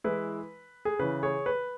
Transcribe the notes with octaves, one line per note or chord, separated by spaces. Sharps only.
E3 G#3 E4 B4
G#4
C#3 E3 C#4 B4
G#4 C#5
B4